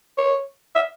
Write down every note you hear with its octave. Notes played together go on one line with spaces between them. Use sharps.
C#5
E5